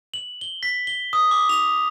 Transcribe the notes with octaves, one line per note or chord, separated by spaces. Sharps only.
F#7
G7
B6
G7
D#6
D6
F7